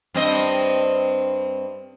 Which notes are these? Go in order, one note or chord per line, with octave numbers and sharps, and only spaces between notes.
G2 C4 D#5